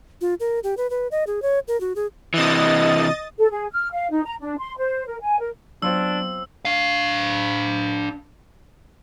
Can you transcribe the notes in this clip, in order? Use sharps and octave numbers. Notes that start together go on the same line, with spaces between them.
F4
A#4
G4
B4
B4
D#5
G#4
C#5
A#4
F#4
G#4
C3 E3 D#5 D#6 A6
A4
G#4
F6
F5
D#4
A#5
D4
C6
C5
A#4
G#5
A#4
F#3 B3 C4 D4 F4 C#5 E6
D4 F5